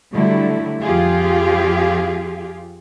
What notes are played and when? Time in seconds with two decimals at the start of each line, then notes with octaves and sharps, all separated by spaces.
0.13 D3 F#3 G3 A3 E4
0.82 F2 F3 F4 G4 G#4 F5